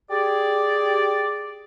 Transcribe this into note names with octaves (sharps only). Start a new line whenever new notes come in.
G4 G#4 D5